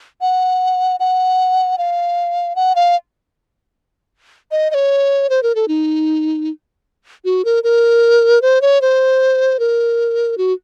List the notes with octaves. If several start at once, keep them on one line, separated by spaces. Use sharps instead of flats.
F#5
F#5
F5
F#5
F5
D#5
D#5
C#5
C5
A#4
A4
D#4
F#4
A#4
A#4
C5
C#5
C5
A#4
F#4